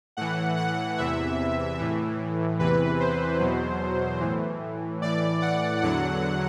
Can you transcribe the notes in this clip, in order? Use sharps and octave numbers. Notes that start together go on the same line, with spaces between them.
A2 E3 F#5
F#5
E2 C3 E3 E5
A2 E3
E2 C3 E3 B4
C5
E2 B2 F#3
A2 E3
A2 E3 D5
F#5
E2 D3 F#3 F#5